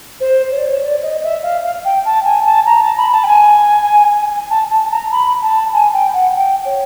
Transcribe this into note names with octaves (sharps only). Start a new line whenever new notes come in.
C5
C#5
D5
C#5
D5
D#5
E5
F5
F5
G5
A5
G#5
A5
A#5
A5
B5
A5
G5
G#5
A5
A5
A#5
B5
A5
G#5
G5
F#5
G5
C#5